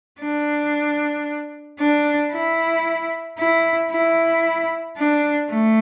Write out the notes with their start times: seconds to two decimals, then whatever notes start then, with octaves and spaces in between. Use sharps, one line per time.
0.21 D4
1.80 D4
2.33 E4
3.38 E4
3.91 E4
4.97 D4
5.50 A3